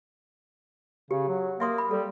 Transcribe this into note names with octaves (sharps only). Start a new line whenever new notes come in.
C#3 G4
F#3
A#3 E5 C6 D#6
B5
G3 A4